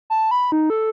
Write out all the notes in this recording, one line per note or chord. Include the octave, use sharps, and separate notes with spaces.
A5
B5
D#4
A4